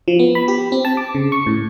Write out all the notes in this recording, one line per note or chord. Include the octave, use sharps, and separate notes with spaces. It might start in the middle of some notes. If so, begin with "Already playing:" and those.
F3
B3
B5
G4
C4
A5
D6
C#3
C#6
A2